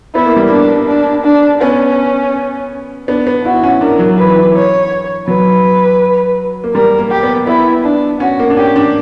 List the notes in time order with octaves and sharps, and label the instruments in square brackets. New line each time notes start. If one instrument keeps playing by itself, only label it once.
[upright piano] B3 [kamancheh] E4
[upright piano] A#3
G3
[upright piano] A#3 [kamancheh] D4
[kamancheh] D4
D4
[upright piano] B3 [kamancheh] C#4
[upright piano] B3 [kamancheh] D4
[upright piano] B3
[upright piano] E4 [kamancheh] F#4
[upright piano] C#4
[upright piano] D4 [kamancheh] A#4
[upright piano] F#3
[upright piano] E3 [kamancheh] B4
[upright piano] E3
[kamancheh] C#5
[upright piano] F#3 [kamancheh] B4
[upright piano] A#3
[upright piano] G3 [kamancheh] A#4
[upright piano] A#3
[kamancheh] G4
[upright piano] B3
[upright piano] B3 [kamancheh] E4
[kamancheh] D4
[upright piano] C#4 [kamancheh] F#4
[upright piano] A#3
D4
[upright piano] C#4 [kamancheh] G4
[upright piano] D4